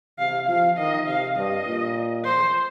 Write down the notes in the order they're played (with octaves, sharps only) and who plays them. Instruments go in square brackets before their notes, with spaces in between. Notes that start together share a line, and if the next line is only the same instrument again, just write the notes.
[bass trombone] C3 [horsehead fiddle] F5
[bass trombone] F3 [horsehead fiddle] F5
[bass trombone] D#3 [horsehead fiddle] D#5
[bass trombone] C3 [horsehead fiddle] F5
[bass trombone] G2 [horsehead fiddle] D#5
[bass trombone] A#2
[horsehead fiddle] C5